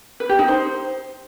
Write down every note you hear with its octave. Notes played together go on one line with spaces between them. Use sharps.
B4
G4
D#4
C5